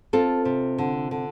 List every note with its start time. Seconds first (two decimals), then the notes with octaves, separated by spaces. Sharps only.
0.13 C4 F4 A4
0.45 C3
0.78 D3
1.11 D3